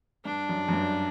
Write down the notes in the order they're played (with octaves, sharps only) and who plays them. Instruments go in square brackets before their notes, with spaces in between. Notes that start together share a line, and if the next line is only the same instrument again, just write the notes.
[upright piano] G2 [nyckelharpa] D4
[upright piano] F#2
F#2
G2